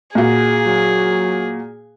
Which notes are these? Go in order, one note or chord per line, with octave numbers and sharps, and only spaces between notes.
A#2 F#4 G#4
F#3